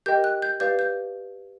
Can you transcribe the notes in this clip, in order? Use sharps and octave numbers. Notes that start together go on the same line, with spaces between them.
G4 A#4 D#5 G5 G6
F#6
G6
G4 B4 D5 F5 G6
G6